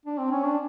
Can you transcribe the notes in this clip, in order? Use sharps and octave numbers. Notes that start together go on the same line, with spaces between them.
D4
C4
C#4
D4